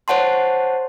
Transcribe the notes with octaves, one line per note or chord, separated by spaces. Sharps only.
C5 C#5 F#5 A5 C6